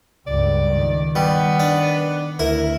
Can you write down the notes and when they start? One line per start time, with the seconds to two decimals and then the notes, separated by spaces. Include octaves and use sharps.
0.27 C#2 G2 D5
0.73 D#3
1.16 G3 B3
1.60 D4
2.39 D2 E4 A#4